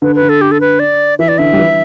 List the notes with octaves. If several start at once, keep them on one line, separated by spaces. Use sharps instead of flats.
D3 B4
B4
D3
A4
G4
A4
B4
D5
E3 E5
D5
D3 E5
G3
E3